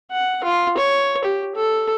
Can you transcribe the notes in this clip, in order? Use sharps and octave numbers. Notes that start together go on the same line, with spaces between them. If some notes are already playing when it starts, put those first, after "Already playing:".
F#5
F4
C#5
G4
A4